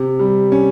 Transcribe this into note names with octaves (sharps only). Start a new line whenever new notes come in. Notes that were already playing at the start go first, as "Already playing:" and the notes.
Already playing: C3
G3
C#4